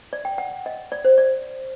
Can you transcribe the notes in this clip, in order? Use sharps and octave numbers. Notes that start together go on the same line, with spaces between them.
D5
G5
F#5
D#5
D5
C5
D5